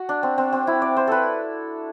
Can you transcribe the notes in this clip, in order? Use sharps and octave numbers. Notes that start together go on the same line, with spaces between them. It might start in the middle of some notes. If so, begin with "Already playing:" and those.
Already playing: F#4
D4
C4
C4
C4
E4
D5
C5
A4 B4